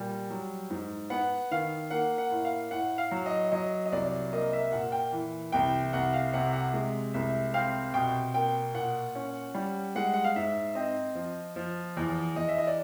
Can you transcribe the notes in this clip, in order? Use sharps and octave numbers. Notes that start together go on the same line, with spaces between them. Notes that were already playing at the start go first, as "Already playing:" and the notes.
Already playing: A#2 G3
F#3
G#2
B3 F#5
D#3 F5
A#3 F#5
F#5
A2
F5
A2 F#5
F5
F#3
D#5
F#3 D#5
D#5
C2 D5
A#3 D#5
E5
A#2 F#5
G5
E3
C2 G5
C2 F#5
F5
C3 F#5
F#5
G#3
C2 E5
C4 F5
B2 G5
A#3 G5
A#2 F#5
C#4
G3
G#3 F#5
F#5
F5
G#2 E5
C4 D#5
F3
F3
E2
E2 D#5
E5
D#5
D5